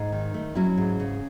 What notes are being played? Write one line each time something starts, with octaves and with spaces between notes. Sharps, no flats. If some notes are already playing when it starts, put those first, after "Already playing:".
Already playing: G#2 D#4
D#3
A3
F#3 C#4 E4
G#2
C#3